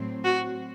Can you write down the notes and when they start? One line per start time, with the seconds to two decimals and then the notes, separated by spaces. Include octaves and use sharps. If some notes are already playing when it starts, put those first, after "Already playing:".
Already playing: A2 F#3 C4
0.24 F#4